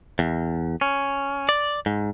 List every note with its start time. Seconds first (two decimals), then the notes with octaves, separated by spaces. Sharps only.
0.19 E2
0.81 C#4
1.49 D5
1.86 G#2